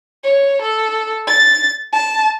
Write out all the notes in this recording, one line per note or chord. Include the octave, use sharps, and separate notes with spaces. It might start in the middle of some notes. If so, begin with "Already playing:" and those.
C#5
A4
A6
A5